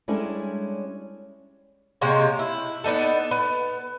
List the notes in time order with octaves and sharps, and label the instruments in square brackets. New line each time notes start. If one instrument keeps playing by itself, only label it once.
[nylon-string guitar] G3 G#3 C#4 D4 E4 A4
[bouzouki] C3 G#3 A#3 C#5
E4
B3 D4 D#4 A4
B3